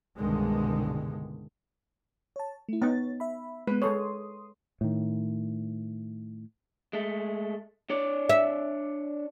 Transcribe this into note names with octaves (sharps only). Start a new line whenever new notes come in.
C2 G2 B2 D3 D#3 G#3
C#5 A5
A3 E4
B3 D#4 C#5 A6
E5 B5
G#3 B3 B4
G#3 A4 C#5 C6 D#6
A2 D#3
G#3 A3
D4 C#5 D5
E5